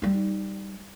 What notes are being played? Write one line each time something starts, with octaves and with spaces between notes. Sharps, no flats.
G3 D#4